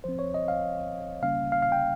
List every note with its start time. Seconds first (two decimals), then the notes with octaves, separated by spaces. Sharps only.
0.04 F3 C4 C5
0.19 C#5
0.34 D#5
0.48 F5
1.22 C#3 G3 A#3 C#4 F5
1.52 F5
1.62 F5
1.72 G5